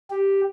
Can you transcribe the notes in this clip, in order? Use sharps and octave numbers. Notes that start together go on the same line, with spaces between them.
G4